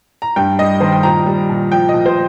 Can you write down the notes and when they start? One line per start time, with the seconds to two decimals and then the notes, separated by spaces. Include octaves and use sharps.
0.22 A#5
0.36 G2 G5
0.59 G3 D#5
0.80 D#3 C5
0.92 G5
1.03 A#2 A#5
1.26 G3
1.49 A#2
1.72 F3 G5
1.89 A#2 D#5
2.06 C5